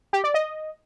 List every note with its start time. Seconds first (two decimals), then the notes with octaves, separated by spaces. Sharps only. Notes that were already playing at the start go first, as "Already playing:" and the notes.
0.13 G4
0.24 D5
0.34 D#5